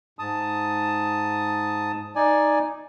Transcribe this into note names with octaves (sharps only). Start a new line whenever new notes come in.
G#2 A5 D#6
D#4 D5 G#5